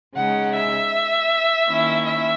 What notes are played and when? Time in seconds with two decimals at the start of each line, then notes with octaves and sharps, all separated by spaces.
0.16 C#3 G#3 D#4 F#5
0.54 E5
1.68 D#3 A#3 C#4 E4
2.06 E5